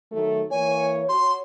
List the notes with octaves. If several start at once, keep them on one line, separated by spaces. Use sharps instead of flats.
D#3 F#3 A3
E3 A#3 C#5 G#5
F#4 C#5 C6